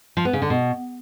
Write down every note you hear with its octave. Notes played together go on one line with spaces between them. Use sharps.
F3
B3
C#3
D3
B2